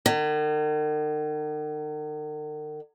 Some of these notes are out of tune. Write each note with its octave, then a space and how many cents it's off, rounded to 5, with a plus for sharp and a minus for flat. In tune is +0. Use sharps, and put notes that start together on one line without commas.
D#3 -45